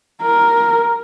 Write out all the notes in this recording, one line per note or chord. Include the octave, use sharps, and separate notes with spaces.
A#4